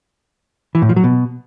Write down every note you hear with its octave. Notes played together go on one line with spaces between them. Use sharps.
E3
A2
F3
F#3
B2